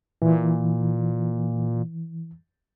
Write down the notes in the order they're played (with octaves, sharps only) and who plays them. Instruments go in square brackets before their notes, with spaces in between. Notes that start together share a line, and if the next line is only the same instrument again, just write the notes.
[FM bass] A#2 [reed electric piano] E3